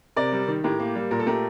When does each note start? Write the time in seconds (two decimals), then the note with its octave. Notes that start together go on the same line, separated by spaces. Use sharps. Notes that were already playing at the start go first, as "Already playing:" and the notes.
0.16 C3 A#4 D5
0.32 G3
0.48 D#3
0.64 A2 G4 A#4
0.80 A#3
0.95 G3
1.11 A#2 A#4
1.19 A4
1.26 A3 G4 A#4